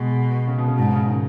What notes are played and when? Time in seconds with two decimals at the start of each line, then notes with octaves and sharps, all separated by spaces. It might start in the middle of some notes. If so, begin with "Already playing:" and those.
Already playing: B2 G#3
0.47 C#3
0.58 B2
0.68 C#3
0.78 G#2 B2
0.93 C#3
1.07 D#3